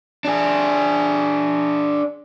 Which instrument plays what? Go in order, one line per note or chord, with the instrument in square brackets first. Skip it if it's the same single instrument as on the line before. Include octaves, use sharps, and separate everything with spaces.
[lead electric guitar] D4 G#4